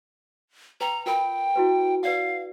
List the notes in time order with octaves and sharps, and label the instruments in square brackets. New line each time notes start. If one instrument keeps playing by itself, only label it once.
[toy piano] B4 G5 [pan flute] A#5
[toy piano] F4 A#4 B5 [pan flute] G5
[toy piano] E4 F#4 B4
[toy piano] B4 D5 F#5 [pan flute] F5